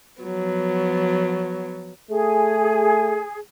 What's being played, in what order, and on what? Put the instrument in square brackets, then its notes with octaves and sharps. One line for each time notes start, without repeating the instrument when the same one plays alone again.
[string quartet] F3 F#3 B3
[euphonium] A3 [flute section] G#4